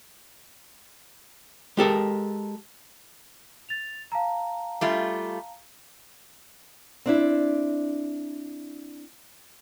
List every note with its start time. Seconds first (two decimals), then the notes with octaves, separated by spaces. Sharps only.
1.77 G#3 G4 A4 A#4
3.69 A6 F7
4.12 F5 A5 A#5
4.81 G3 A3 F4
7.06 C4 D4 E4